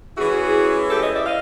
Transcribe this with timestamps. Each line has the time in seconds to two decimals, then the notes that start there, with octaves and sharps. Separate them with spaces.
0.17 E3 G#3 C#4 E4 F#4 G#4
0.90 G4 A4
1.03 C#5 D#5
1.14 D5 E5
1.26 D#5 F5